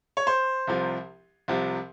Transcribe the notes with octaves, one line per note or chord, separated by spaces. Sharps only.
C#5
C5
C2 C3 F3
C2 C3 F3